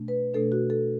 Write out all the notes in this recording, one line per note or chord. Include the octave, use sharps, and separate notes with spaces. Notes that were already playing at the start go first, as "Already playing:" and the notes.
Already playing: B2 A3 D4
B4
B2 A3 D4 A4
F#4
A4